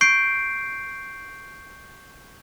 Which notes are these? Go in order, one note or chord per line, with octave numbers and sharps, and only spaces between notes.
C#6 G6 C7 D7